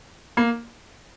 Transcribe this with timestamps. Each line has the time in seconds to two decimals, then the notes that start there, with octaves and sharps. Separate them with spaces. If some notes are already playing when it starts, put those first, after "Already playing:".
0.37 A#3